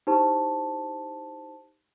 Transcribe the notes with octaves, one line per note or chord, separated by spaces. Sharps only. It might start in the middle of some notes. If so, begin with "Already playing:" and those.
D#4 E4 G4 C5 A5 C#6